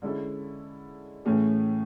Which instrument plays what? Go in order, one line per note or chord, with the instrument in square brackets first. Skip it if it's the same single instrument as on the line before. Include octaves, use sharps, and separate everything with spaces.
[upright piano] D3 G#3 C#4 E4 A4
A2 E3 A3 C#4 G#4